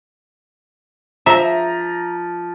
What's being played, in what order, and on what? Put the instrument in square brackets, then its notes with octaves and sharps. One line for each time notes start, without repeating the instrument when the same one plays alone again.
[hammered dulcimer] F3 [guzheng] E5 [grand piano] A#5 B6